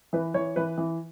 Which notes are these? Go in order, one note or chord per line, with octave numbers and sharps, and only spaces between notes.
E3 B4
E3 C#5
E3 B4
E3